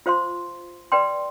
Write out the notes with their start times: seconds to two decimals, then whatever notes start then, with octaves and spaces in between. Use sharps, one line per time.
0.06 F4 C5 F5 C6
0.92 B4 D5 G5 C6